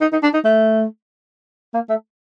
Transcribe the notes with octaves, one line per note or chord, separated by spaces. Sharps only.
D#4
D#4
D4
D#4
A3
A#3
A3